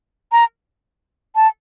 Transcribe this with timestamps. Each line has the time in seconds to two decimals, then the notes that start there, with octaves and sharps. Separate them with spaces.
0.32 A#5
1.36 A5